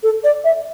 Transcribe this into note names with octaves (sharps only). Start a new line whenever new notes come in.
A4
D5
E5